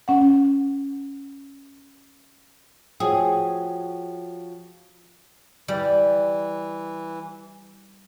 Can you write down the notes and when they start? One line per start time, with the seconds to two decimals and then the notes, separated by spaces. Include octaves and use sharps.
0.08 C#4 F#5
3.00 F3 F#4 G#4 C#5 G5 D#6
5.68 E3 G3